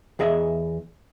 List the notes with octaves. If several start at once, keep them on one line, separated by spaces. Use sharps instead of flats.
E2 G#4 D#5 E5